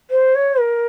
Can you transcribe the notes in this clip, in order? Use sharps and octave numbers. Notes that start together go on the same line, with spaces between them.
C5
C#5
A#4